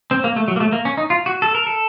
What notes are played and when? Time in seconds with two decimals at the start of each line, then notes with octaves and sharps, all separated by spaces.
0.11 C4
0.24 A#3
0.36 A3
0.48 F#3
0.56 A#3
0.60 A3
0.72 A#3
0.85 C#4
0.97 D#4
1.10 F4
1.26 F#4
1.42 A4
1.55 A#4
1.67 A4